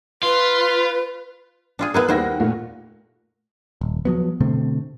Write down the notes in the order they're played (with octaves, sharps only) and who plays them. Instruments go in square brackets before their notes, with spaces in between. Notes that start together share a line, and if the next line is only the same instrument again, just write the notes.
[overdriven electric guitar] F4 [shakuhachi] B4
[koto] D4 F4 G#4
[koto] B3 E4 G#4 [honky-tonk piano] A#4 F6 F#6
[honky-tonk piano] D#2 F#5 A#6 [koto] G3 E4 C5
[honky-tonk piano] A#2 A3 F4
[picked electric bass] D#1
F3 F#3 B3
B2 D3 A3 C4